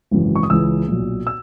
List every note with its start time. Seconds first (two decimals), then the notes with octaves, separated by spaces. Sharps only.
0.11 G#1 F#2 C#3 E3
0.36 C#6
0.43 D#6
0.50 C#2 C#3 E3 E6
0.88 B1 A#2
1.27 E6